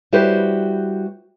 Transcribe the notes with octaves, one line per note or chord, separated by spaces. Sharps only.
G3 E4 F#4 G4 B4 C5